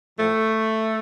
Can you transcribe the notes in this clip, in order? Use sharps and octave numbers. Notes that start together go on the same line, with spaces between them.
A2 F3 A3